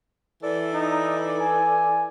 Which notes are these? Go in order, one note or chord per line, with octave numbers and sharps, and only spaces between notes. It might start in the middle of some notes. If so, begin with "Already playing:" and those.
E3 A4 D5
D#4
G#5